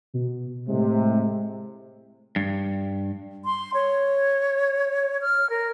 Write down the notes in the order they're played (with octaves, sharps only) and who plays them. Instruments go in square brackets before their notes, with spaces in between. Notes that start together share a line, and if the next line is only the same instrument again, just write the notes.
[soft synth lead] B2
[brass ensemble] A2 C3 [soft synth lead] G#3
[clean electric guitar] G2
[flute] C6
C#5
F6
A#4